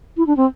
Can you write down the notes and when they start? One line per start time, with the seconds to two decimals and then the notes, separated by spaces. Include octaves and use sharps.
0.17 E4
0.27 D4
0.37 C4